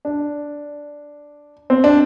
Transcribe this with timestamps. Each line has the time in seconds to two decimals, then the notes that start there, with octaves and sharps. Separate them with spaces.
0.05 D4
1.70 C4
1.84 D4